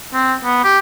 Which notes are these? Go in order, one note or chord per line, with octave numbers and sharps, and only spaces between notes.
C4
B3
G4